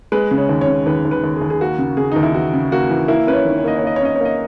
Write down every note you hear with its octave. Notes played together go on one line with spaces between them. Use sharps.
G#3 B4
C#3
C#5
D#2
C#5
C#3
D#2 B4
D#2
B4
D#2
G#4
D#2
G#4
A#3 F#4
C#3
C#3 G#4
D#2 D#4
E4
E3 F#4
C#3
A#3 F#4
E3
A#3 E4
C#4 B4
C#5
D#3
C#5
A#3 D#5
C#5
A#3 D#5
C#5
C#4 D#5
A#3 C#5
D#5